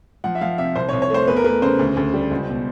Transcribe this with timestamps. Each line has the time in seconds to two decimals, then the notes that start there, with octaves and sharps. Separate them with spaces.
0.24 F3 F#5
0.35 E5
0.41 F3 F5
0.58 C3 E5
0.75 C2 C5
0.89 C#5
0.93 C2
1.02 C#5
1.10 A3 C5
1.27 E2 B4
1.36 A#4
1.44 A3 B4
1.62 C#3 C5
1.79 D2
1.97 D2
2.14 G3
2.31 C#2
2.48 B2